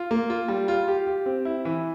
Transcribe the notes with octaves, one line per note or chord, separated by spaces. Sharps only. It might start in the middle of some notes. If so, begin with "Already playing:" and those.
Already playing: F4
A#3
F4
G3
F4
G4
G4
C4
E4
E3